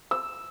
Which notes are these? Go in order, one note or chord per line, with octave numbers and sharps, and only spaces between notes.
E6